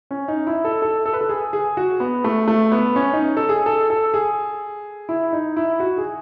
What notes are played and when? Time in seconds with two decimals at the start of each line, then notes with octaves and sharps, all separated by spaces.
0.11 C#4
0.28 D#4
0.47 E4
0.65 A4
0.82 A4
1.06 A4
1.13 B4
1.21 A4
1.29 G#4
1.53 G#4
1.77 F#4
2.00 B3
2.24 A3
2.48 A3
2.72 B3
2.96 C#4
3.13 D#4
3.37 A4
3.49 G#4
3.66 A4
3.90 A4
4.14 G#4
5.09 E4
5.33 D#4
5.57 E4
5.80 F#4
5.98 G#4